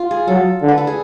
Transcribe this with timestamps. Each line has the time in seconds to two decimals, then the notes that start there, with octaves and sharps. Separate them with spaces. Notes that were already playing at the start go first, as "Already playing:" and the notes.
Already playing: F4
0.11 G#4
0.27 F#3 A4
0.62 D3
0.68 B4
0.78 A4
0.87 G#4